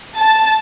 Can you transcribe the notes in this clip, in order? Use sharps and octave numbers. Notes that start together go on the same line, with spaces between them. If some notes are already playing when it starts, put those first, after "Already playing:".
A5